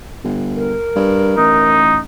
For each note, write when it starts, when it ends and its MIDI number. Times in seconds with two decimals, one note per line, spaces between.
0.24 0.76 31
0.54 1.75 70
0.96 1.37 43
1.37 2.02 33
1.37 2.00 63